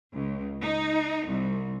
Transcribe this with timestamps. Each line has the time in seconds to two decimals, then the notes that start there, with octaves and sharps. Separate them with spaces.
0.13 C#2
0.62 D#4
1.27 C2